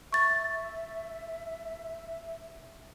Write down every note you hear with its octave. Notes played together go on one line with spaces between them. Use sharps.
E5 C#6 A6